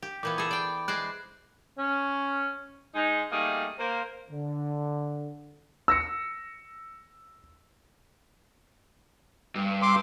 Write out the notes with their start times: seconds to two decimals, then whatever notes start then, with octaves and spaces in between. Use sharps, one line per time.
0.02 G4
0.23 A#2 E3 B3 D6 G6
0.38 G#4 A4 B5
0.51 D5 G5
0.88 G#3 C5 D5 F#6
1.78 C#4
2.94 G#3 D#4
3.31 G3 A3 A#3 D#4 G#4
3.79 A#3 C5
4.30 D3
5.88 E6 A#6 C#7
9.55 G2
9.82 C6 D6